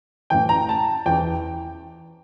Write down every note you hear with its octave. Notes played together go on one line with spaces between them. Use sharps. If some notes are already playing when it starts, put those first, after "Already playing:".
A2 E3 G5
A#5
A5
E2 E3 G5